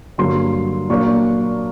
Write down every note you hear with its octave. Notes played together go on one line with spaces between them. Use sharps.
G2 D3 F#3 A#3 C6
A#2 F#3 A#3 D4 C#6